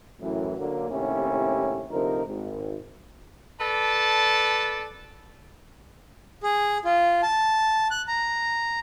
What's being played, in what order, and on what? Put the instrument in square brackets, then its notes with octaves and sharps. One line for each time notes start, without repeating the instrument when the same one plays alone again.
[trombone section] F#2 A2 E3
D3 F#3 A#3
D#2 A2 C3 C#4 E4 G4
D2 C3 F3 D#4 A#4
G#1
[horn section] A4 B4 D5 A5
[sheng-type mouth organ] G#4
F4
A5
F#6
A#5